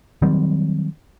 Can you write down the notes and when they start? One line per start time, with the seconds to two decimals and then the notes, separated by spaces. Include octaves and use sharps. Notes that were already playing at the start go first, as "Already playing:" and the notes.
0.22 D#3 F#3 G3 C4